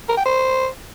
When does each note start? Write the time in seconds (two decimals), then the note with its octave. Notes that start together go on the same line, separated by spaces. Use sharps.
0.09 A#4
0.17 G5
0.25 C5